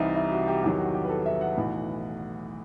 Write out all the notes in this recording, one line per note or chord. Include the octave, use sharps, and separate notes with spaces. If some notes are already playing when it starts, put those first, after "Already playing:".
Already playing: C2 C3 E3 G3 D#4 E4
E4
F#4
G4
E2 D#3 F#3 G4
F#4
G4
B4
A4
E5
F#5
B1 A2 E3